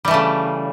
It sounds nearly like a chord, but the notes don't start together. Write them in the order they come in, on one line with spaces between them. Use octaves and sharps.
G3 E3 A3 C#3